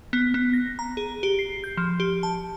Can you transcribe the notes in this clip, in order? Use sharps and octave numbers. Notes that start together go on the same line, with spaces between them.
B3
B3
A#6
A#5
G#4
G4
C7
G6
F3
G4
A5